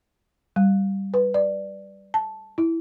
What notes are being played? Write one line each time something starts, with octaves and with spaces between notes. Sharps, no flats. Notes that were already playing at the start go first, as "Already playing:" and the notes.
G3
B4
D5
A5
E4